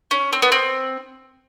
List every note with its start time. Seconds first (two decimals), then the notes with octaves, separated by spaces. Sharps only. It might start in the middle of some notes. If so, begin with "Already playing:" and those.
0.11 C#4
0.33 C4
0.42 B3
0.52 C4